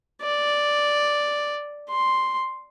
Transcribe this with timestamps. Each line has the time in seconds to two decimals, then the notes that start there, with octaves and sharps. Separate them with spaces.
0.22 D5
1.90 C6